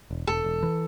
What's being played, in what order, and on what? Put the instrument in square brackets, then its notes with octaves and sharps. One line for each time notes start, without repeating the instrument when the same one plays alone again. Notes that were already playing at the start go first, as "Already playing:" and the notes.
[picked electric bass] E1
[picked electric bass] E1 [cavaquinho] A4
[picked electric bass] E1
E3